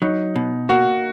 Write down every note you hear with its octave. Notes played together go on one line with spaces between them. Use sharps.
F#3 D#4
B2
A#3 F#4